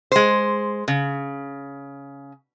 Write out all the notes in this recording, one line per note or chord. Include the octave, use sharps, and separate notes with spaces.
G#3 C5
C#3